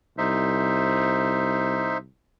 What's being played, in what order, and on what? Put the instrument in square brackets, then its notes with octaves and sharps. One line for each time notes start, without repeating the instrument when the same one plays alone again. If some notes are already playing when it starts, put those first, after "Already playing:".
[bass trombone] C2 [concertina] D#4 C5 E5